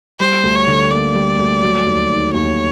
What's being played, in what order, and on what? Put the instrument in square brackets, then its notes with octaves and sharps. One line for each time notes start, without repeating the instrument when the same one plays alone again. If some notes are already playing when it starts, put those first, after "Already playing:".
[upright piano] G3 [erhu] C5
[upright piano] D2
[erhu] C#5
[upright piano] D3
[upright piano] A#3 [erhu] D5
[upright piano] G3
D2
F#3
D#2
D#3
[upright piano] D#2 [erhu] C#5